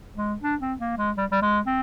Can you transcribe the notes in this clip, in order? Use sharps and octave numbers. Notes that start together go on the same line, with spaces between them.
G#3
D4
C4
A#3
G#3
G3
G3
G#3
C4